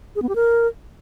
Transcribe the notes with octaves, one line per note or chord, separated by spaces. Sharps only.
G#4
B3
G4
A#4